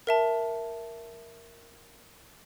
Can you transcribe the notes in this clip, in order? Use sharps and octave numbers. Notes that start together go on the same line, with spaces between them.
A#4 E5 A5